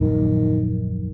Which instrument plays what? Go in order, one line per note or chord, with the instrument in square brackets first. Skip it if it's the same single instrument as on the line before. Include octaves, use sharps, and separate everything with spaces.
[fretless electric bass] D#1 A#1 F#2 [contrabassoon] D#3